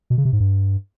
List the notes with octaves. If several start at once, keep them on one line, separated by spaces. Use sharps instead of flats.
B2
C#3
C3
G#2
G2